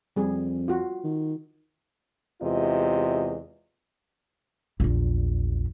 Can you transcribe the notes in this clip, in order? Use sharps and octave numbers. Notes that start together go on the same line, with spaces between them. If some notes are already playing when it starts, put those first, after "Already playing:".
F2 G3 G#4
F4 F#4
D#3
E2 C3 G#3 F4 D#5
A#1 E2